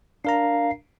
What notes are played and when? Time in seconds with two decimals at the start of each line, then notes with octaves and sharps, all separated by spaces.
0.25 D4 A#4 F5 A#5